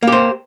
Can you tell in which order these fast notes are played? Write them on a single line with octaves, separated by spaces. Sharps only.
A#3 G4 C5